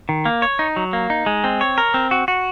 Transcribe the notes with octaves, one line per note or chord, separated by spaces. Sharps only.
D#3
A#3
C#5
D#4
F#3
A#3
D#4
G#3
C4
C#5
A#4
C4
F#4
F#4